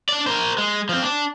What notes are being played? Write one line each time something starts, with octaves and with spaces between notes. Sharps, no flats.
D4 D5
A#4 C5
G#3
F3 C4
D4